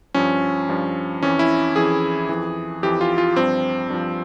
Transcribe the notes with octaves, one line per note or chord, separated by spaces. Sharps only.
G2 F3 C#4
G2 F3
F2 E3 C#4
E4
F2 E3 G#4
F2 E3
F2 E3 G4
F4
F4
G2 F3 C4
G2 F3